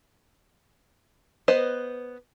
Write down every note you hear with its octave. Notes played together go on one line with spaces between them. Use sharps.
B3 B4 C5 D#5